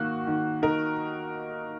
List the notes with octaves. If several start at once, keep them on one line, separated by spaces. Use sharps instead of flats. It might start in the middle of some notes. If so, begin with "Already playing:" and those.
Already playing: D#3 A#3 F#4
D#3
D#4 A#4